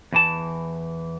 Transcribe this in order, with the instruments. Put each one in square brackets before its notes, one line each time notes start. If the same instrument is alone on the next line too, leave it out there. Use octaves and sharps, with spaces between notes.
[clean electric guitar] E2 E3 A5